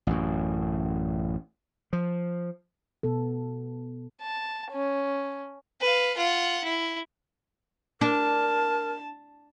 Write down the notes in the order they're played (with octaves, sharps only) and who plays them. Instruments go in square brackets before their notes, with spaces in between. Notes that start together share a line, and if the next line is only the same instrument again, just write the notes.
[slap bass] A1 F#2
F3
[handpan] B2 B3 A4
[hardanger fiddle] A5
C#4
[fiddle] B4 F5
F4 F#5
E4
[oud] D4 [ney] A#4 [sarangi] A5